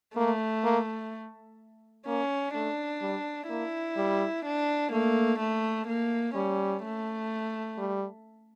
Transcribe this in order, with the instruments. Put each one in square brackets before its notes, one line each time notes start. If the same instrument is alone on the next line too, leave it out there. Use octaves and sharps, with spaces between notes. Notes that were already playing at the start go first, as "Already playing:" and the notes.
[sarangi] A3 [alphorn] A#3
[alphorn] A#3
[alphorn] A#3 [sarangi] C#4
[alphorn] A3 [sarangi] D4
[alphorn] G3
[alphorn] A#3 [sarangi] E4
[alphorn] G3
[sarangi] D4
[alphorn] A3 [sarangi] A#3
[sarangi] A3
A#3
[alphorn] G3 [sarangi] C#4
[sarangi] A3
[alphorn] G3